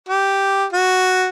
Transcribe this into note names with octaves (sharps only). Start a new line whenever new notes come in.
G4
F#4